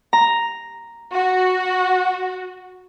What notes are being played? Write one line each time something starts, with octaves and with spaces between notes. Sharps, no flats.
A#5
F#4